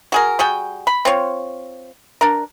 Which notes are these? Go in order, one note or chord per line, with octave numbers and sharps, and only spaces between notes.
F#4 G#4 A#4
G3 F#4 G#4 G5
B5
C4 F4 C#5
D4 A#4